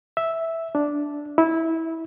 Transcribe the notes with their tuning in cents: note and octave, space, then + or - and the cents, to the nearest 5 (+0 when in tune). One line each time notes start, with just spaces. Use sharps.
E5 -5
D4 -5
E4 -20